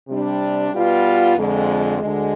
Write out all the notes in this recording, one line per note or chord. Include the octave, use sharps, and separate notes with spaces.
C3 G3 D4
B2 G3 B3 F4
F2 D3 G#3
D2 D3 G#3